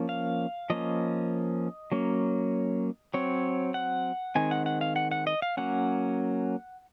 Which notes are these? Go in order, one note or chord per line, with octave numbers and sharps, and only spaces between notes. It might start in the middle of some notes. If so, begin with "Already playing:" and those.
Already playing: F3 A#3 C#4
F5
F3 A#3 C#4 D#5
F#3 A#3 C#4
F#3 C4 C#5
F#5
D#3 G#3 C4 G#5
F#5
F#5
F5
F#5
F#5
D#5
F5
F#3 A#3 C#4 F#5